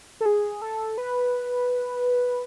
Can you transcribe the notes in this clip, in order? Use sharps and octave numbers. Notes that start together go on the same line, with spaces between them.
A4
G#4
A4
B4